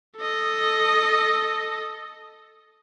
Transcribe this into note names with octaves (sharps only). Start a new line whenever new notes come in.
A4 D#5